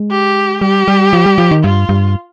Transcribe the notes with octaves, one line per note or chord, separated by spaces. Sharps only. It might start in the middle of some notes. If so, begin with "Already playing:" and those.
Already playing: G#3
G4
G3 G4
G3
F3
G3
F3
D#3
G2 F4
G2